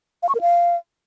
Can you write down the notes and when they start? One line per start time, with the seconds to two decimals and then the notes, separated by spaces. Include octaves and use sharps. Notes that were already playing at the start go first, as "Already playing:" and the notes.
0.23 F5
0.29 C#6
0.35 A#4
0.41 F5